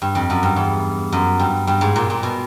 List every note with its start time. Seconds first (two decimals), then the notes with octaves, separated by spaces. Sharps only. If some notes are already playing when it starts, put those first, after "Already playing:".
0.02 G2
0.15 F2
0.30 F#2
0.43 G2
0.56 E2
1.12 F#2
1.40 G2
1.67 G2
1.81 G#2
1.96 A#2
2.10 A#2
2.23 B2